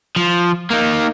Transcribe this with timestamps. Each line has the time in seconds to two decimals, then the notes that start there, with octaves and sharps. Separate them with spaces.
0.16 F3
0.71 A#3 D#4